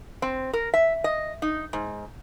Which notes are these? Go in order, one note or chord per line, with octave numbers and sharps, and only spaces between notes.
C4
A#4
E5
D#5
D#4
G#2